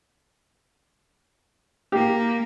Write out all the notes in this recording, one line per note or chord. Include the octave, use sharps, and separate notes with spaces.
A#3 G4